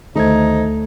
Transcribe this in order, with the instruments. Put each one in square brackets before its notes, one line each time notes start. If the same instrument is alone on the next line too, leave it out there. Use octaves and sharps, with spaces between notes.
[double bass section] D2 [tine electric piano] D#3 C5 G#6 [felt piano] A3 [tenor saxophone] D#4